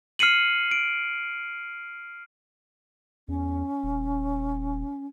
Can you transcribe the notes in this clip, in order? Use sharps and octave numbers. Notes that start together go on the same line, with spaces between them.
F6 C7 C#7 D#7 F#7
D7
E2 C#4
D#1